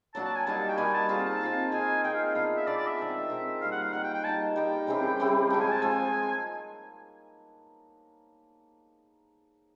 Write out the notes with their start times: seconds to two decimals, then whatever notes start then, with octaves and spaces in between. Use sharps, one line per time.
0.14 F#3 A#3 D4 F#4 A5
0.25 A5
0.36 G#5
0.46 G3 A#3 D#4 F#4 A5
0.69 G5
0.78 G3 A#3 D#4 F#4 G#5
0.94 A5
1.09 C4 F4 G#4 A5
1.25 A5
1.41 C4 F4 G#4
1.72 C4 D#4 G#4 G#5
2.03 C4 D#4 G#4 G5
2.14 F5
2.25 F5
2.35 B3 D4 F4 F5
2.57 E5
2.67 B3 D4 F4 D5
2.77 D5
2.87 E5
2.98 D#3 G#3 C4
3.30 D#3 G#3 C4
3.61 D#3 G3 A#3 F5
3.72 F#5
3.82 F5
3.93 D#3 G3 A#3 F#5
4.03 G5
4.14 G5
4.24 G3 A#3 D#4 A5
4.56 G3 A#3 D#4 G5
4.87 C#3 E3 G3 C4
5.20 C#3 E3 G3 C4
5.50 F3 G#3 C4 G5
5.61 G#5
5.72 A5
5.82 F3 G#3 C4 G#5